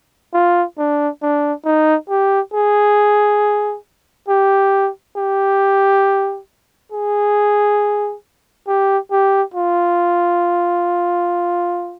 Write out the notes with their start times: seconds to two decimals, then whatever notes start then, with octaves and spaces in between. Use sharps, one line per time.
0.33 F4
0.78 D4
1.22 D4
1.65 D#4
2.09 G4
2.54 G#4
4.28 G4
5.17 G4
6.92 G#4
8.67 G4
9.12 G4
9.54 F4